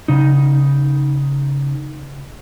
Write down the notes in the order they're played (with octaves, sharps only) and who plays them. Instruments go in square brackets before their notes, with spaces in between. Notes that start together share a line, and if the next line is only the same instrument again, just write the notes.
[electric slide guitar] C#3 D#4